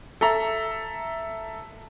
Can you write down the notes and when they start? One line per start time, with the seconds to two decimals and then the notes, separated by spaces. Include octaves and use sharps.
0.21 A4 E5 A#5